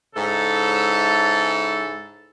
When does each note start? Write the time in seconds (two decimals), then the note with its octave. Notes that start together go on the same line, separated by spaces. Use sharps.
0.15 G#2 C#3 E4 A4